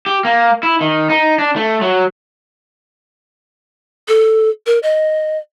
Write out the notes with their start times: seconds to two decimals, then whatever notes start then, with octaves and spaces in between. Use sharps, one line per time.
0.06 G4
0.25 A#3
0.63 E4
0.81 D#3
1.10 D#4
1.39 D4
1.56 A3
1.82 F#3
4.08 A4
4.67 A#4
4.83 D#5